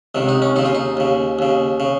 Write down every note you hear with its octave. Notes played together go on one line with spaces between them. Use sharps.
C#2 C3 D#3
D#4
C#4
D#2 C#3 D#4
F4
D#4
D#2 C#3
D#2 C#3
C#3